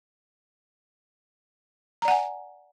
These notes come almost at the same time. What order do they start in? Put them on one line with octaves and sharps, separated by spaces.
A#5 D5 F#5 G#5